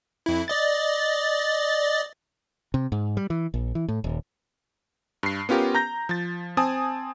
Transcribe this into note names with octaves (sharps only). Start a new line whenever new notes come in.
F2 E4
D5 D#5 A6
C3
G#2
G3
E3
A#1
E3
A2
D#1
G2 C7
B3 C#4 F4 G4 A#4
A#5 G6 A#6
F3 A6
C4 G#5 A5 D#6